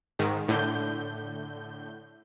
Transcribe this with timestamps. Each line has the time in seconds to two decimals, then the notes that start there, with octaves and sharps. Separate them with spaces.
0.19 G#2 D#3
0.48 A2 D3 G6